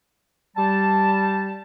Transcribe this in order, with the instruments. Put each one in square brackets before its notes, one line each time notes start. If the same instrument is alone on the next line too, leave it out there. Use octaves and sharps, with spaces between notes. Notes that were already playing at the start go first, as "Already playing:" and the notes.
[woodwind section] G3 A5